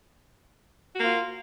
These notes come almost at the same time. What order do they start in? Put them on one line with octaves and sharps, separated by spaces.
F#4 A#3 F4